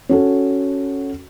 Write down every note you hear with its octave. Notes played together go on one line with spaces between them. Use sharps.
C#4 F#4 A4